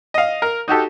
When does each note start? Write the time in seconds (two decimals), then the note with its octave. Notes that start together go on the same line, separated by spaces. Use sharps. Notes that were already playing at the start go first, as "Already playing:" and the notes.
0.14 D#5 F5
0.42 A#4
0.68 D#4 F#4 G4 A4